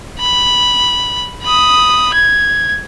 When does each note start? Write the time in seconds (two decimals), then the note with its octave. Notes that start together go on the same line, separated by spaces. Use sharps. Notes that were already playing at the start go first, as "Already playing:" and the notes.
0.20 B5
1.43 B5 D#6
2.14 G#6